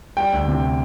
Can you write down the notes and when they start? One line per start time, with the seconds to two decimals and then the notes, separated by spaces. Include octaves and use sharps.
0.17 G3 G5
0.33 D2
0.48 C3